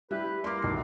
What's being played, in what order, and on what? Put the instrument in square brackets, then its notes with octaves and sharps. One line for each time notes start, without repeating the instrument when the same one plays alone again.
[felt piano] G3 [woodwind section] E4 G4 B4
[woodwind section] G3 A3 A#3 [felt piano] C6 D6
[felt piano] B1 C7